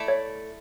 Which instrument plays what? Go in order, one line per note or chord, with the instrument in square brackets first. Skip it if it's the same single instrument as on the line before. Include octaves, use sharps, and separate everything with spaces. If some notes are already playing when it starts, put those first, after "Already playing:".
Already playing: [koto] A3 E4 A4 D5
[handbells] C#5 E5